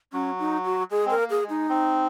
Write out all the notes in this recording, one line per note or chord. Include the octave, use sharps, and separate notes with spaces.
F#3 C#4
D#4
F#4
G#3 G#4
C4 A#4
A#3
G#4
G#3
D#4
C4